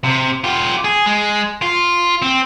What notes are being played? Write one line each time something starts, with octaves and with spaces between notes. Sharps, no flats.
C3
F4 G4
G#4
G#3
F4
C4